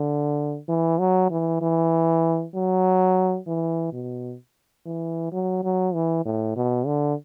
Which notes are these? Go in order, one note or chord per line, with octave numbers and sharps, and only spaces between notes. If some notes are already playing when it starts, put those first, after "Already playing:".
Already playing: D3
E3
F#3
E3
E3
F#3
E3
B2
E3
F#3
F#3
E3
A2
B2
D3